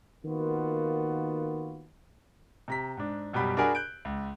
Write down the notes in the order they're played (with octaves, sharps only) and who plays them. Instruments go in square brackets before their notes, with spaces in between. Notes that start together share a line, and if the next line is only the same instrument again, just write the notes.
[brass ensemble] D#3 A#3 B3 F4 F#4
[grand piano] C3 A#5 B6
G#2 D4
F#2 B2 G3 G4 B5
D4 F#4 G#4 A#4 G#5 B5
F#6 G6 D7
C#2